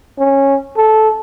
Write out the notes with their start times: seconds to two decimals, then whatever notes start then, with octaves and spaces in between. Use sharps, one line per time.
0.19 C#4
0.77 A4